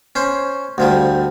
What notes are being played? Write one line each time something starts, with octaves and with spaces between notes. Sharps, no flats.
C#4 C5
D2 F3 G3